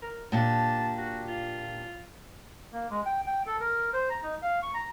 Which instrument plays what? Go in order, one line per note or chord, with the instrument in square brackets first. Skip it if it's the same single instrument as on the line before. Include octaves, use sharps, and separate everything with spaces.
[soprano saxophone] A#4
[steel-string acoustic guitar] A#2 D4 G4 [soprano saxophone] A5
[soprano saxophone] F#4
F4
[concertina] A#3
G#3
G5
G5
A4
A#4
C5
A#5
D#4
F5
C#6
A#5